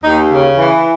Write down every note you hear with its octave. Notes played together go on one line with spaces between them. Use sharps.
D#2 D#4
C#3
E3